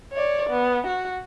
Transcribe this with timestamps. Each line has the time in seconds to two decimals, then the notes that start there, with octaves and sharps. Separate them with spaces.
0.13 C#5 D5
0.50 B3
0.87 F#4